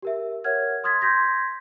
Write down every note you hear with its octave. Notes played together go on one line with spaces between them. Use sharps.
G4 A#4 E5
A#4 C#5 E5 F#5 F6 G#6
C6 D#6 F6 G#6 A6 B6
C6 G6 G#6 A#6 B6